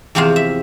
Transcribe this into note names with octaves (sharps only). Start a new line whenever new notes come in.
E2 C3 F3 C4 F5
E5